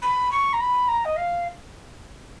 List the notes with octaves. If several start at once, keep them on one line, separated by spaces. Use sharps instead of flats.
B5
C#6
A#5
B5
A#5
D#5
F5